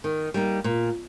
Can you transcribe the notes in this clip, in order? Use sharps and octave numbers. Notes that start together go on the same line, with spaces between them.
D#3
G3 A#3 D#4
A#2